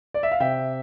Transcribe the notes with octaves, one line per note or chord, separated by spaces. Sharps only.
D5
E5
F5
C3 E5 G5